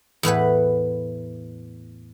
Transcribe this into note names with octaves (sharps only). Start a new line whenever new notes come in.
E2 A2 B4 F#5